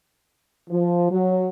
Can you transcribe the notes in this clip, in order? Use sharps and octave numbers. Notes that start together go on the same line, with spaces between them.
F3
F#3